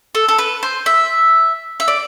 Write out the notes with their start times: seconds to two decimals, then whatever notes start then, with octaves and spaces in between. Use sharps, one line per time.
0.15 A4
0.28 A4
0.38 B4
0.63 C5
0.86 E5
1.80 E5
1.88 D5